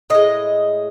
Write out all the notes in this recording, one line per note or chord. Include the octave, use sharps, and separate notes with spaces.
A2 G#3 D#5